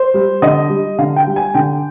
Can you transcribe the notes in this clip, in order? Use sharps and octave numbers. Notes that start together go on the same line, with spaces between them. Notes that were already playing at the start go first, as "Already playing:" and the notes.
Already playing: C5
G3
D3 D#5
G3
D3 F5
G5
G3
G#5
D3 G5